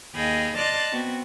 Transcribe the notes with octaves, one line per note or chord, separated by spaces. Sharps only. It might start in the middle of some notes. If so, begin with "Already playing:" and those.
D#2 G#4 D#5 F5 G5 B5
D5 D#5 A5 C6 F6 F#6
B3 C4 F#4